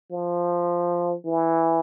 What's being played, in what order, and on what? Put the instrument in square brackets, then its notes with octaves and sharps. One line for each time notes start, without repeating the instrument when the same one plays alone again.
[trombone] F3
E3